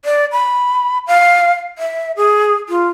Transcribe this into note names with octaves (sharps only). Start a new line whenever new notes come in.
D5
B5
F5
E5
G#4
F4